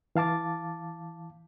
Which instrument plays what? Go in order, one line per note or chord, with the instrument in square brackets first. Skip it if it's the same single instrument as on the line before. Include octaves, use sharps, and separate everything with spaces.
[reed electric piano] E3 F5 A5 D6 A6